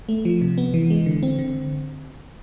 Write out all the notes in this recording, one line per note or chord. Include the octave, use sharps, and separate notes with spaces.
A3
F3
C3
B3
E3
G#3
D3
C4
D3